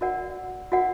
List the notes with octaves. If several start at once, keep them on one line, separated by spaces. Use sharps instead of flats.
F#4 A#4 D5 F#5
F#4 A#4 D5 F#5